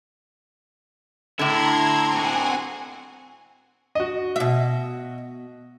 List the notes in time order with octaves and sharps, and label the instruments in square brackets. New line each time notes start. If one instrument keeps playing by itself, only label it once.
[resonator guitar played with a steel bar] A2 D3 [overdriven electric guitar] E4 [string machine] A#5 C6 G#6
[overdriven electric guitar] C4 F#4 [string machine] F#5 G#5
[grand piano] F#4 D#5
[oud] B2 E5